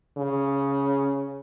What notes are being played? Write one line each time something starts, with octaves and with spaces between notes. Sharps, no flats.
C#3